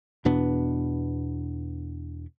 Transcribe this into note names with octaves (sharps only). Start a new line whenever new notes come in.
E2 B2 B3 D4